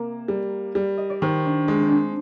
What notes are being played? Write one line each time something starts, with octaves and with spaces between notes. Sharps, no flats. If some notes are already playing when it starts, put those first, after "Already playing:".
Already playing: C3 A#3 A#4
G3
G3
D#5
D5
D#3 C5
D4
G#3 D4
C4
D4